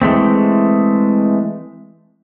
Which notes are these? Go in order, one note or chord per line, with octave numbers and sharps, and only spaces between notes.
E3 G#3 A3 C4